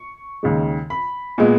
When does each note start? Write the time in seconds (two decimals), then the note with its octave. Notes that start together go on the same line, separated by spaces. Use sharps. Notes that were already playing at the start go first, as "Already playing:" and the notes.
Already playing: C#6
0.43 D#2 C#3 G#3
0.90 B5
1.38 A#2 G#3 B3